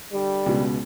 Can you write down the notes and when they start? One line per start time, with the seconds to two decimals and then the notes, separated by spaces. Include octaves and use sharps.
0.12 D3 G3
0.46 C#2 B2